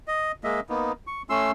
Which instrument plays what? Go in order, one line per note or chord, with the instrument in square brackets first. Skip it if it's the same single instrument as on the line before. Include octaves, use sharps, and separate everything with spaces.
[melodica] D#5
G#3 A#3 D#5 E5
A#3 B3 D#4
C#6
A3 C#4 C6 E6